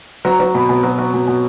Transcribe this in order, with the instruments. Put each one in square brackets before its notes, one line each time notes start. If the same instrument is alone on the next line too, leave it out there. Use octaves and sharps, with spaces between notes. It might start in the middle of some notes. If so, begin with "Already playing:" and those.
[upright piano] F#3 A#5
F#3
B2 B5
B2
F#3
F#3
B2
B2